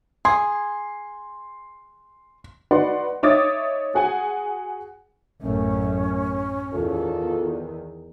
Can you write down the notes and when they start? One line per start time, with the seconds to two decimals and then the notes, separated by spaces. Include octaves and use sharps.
0.25 G#4 C6
2.71 D#4 F#4 B4 D5 F#5 C6
3.23 D#4 C#5 E5 D6 D#6 A6
3.94 F#4 G#4 F#5 G#5
5.42 A1 F#2 A3 C#4
6.73 E2 D#3 F4 A4